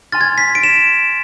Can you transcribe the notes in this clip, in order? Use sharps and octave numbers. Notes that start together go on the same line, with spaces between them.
G#5 C6 F6 A6
G#6
B6
D7
E7